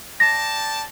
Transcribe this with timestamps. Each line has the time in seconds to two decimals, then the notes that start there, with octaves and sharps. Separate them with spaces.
0.20 D5 G5 A5 A#6